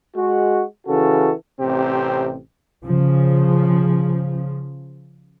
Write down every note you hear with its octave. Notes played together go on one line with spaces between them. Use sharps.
G#3 F#4
C#3 E3 F#4 A4
A1 C3 C4 G4
C#3 F3